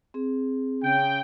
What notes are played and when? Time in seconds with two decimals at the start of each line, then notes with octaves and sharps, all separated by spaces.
0.14 C4 G#4
0.83 C#3 G5